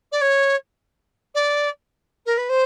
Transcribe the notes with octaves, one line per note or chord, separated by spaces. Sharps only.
D5
C#5
D5
A#4
B4
C5